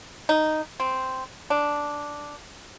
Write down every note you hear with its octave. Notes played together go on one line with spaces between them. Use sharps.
D#4
C4
D4